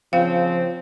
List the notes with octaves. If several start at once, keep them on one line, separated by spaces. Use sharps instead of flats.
C#3 F3 C4 F5